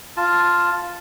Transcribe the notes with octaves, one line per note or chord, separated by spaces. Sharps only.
F4 A5